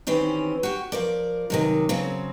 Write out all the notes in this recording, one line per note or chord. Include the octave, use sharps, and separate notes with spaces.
D#3 E3 C4 C#4 G4
F#4 G4
F3 A#4 D5
F#2 C3 D#3
C#3 F#3 C4